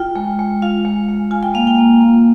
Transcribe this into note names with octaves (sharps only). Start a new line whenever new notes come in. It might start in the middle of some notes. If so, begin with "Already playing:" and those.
Already playing: F4 G5
G#3
G#3
F4 F5
G#3
G#3
F4 G#5
G5
A#3 F5
G5
A#3
A#3